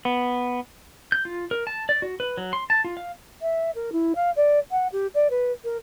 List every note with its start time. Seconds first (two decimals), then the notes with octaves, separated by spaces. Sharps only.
0.05 B3
1.12 G6
1.25 F4
1.51 A#4
1.67 A5
1.89 D5
2.02 F#4
2.20 B4
2.37 F#3
2.53 C6
2.70 A5
2.84 F4
2.97 F5
3.41 E5
3.75 A#4
3.92 E4
4.15 F5
4.36 D5
4.71 F#5
4.92 G4
5.14 D5
5.30 B4
5.64 A#4